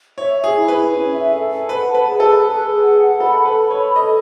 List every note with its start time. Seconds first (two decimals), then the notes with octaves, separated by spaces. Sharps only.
0.18 C#5 E5
0.37 E5
0.44 G#4
0.56 E4
0.68 B4
0.75 E4
0.94 C#4
1.13 E5
1.31 A4
1.50 A4
1.69 B4 F#5
1.88 A5
1.94 B4
2.07 G#4
2.20 A4
2.25 B4
2.45 G#4
2.63 G#4
2.82 F#5
3.01 F#5
3.20 A4 B5
3.39 A4
3.45 B4
3.58 B5
3.71 C#5
3.77 B5
3.95 A4 D#5